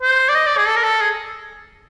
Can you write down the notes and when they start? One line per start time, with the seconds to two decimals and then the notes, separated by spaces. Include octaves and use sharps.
0.02 C5
0.29 D5
0.35 D#5
0.46 D5
0.57 G#4
0.68 A4
0.76 A#4
0.83 A4
1.01 G#4